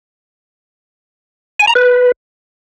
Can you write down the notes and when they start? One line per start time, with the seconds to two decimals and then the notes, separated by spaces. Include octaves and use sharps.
1.60 G#5
1.67 A#5
1.75 B4